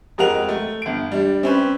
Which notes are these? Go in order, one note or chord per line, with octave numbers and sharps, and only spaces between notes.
F2 G#3 A#4 F#5 F7
A3
G1 D7
G3 D4
C4 C#4 B4